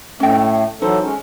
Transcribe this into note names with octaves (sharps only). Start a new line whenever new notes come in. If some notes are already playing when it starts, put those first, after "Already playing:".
A2 A3 C#4 D#5 G5
E3 F#3 D#4 A4 C5
G#3 C#4